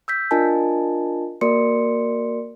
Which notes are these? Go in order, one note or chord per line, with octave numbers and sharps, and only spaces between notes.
E6 G6 B6
D4 F4 A#4 D#5 G#5 A5
A#3 F#4 A#4 D5 C6 C#7